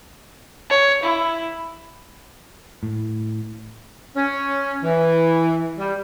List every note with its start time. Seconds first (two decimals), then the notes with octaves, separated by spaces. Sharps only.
0.70 C#5
1.03 E4
2.83 A2
4.15 C#4
4.83 E3
5.78 G3